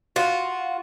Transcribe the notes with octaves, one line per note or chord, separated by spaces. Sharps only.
F4 F#4